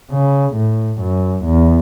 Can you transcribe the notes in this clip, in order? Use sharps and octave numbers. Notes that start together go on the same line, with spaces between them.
C#3
A2
F#2
E2